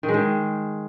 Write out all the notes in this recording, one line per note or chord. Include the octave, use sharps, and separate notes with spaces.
D#3
G#3
D#3